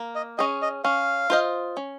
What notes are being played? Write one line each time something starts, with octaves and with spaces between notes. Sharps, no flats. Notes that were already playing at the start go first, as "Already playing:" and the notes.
Already playing: A#3
D#5
C#4 G#4 D#5
D#5
C#4 F5
F4 C5 D#5
C#4